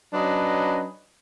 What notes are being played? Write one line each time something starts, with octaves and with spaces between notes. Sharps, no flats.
F#3 C#4 D4 B4 D#5